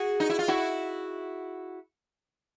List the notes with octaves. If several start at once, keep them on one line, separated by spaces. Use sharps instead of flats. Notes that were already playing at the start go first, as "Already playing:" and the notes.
Already playing: F#4 G#4
D#4
E4
F4
E4 F#4